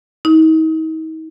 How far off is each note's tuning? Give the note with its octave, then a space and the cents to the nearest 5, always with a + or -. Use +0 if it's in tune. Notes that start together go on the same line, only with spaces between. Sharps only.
D#4 +40